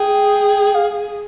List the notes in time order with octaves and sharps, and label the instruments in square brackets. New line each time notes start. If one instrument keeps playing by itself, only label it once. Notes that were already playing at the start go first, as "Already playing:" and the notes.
Already playing: [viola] G#4 [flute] G5
[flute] F5